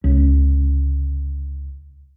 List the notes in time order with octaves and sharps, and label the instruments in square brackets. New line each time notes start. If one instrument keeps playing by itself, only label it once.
[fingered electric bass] C#2 C3 C#4